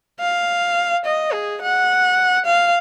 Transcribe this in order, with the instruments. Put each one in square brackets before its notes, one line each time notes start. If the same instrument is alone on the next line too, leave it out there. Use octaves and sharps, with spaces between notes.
[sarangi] F5
D#5
G#4
F#5
F5